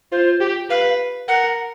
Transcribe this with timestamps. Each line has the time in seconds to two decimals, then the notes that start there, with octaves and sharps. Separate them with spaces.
0.12 F4 C5
0.41 G4
0.70 B4 F5
1.28 A#4 F#5